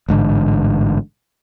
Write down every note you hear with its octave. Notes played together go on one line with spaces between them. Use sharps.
A1 G#2 D3